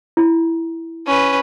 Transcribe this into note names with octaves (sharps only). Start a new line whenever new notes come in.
E4
C#4 B4